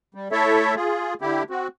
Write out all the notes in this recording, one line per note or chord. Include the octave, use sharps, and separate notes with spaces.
G3
A3 E4 A4 C#5 E5
F4 G#4
D3 E4 G4
C4 F#4